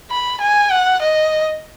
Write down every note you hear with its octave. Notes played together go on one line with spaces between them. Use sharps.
B5
G#5
F#5
D#5